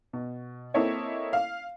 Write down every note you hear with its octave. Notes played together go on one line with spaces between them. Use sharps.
B2
A#3 C4 E4 A4 C#5 D#5
F5